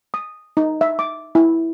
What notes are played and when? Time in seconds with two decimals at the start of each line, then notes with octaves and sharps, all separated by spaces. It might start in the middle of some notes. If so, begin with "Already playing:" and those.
0.14 D#6
0.57 D#4
0.81 E5
0.99 D6
1.35 E4